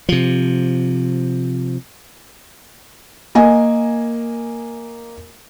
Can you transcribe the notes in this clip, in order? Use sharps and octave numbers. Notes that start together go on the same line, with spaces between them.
C3 F3
A#3 D#5 G#5